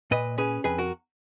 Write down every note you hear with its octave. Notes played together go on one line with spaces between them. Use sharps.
A#2 B4 D#5
C#4 G#4 B4
F2 G#4 B4
F#4 A#4